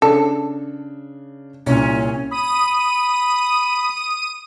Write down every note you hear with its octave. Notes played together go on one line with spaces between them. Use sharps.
C#3 D4 A4
C2 A#2 C#4
B5 D#6 D#7